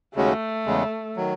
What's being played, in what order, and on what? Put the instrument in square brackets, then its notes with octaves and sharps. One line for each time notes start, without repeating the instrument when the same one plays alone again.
[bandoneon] D#2 C#3 G#3 C#4 F#4 [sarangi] A3
[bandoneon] E2 C#3 G#3
D#3 F#3